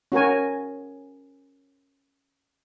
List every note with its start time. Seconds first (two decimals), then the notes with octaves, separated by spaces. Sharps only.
0.12 C#4 F#4 A#4 G#5